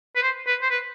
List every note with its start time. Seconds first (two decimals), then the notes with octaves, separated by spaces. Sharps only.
0.16 B4
0.22 C5
0.47 B4
0.62 C5
0.70 B4